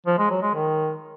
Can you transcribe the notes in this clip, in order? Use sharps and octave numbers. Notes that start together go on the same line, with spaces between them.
F3
G#3
F#3
G#3
D#3